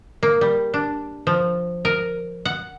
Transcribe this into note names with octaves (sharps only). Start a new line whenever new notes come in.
A#3
G3
D4
F3
A#4
F#5